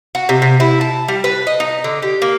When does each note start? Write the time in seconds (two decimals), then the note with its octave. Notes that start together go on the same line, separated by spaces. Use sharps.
0.15 F#4
0.29 C3
0.42 C3
0.60 E4
0.81 A5
1.08 G3
1.24 B4
1.47 D#5
1.60 D#4
1.84 D3
2.03 G4
2.22 A#3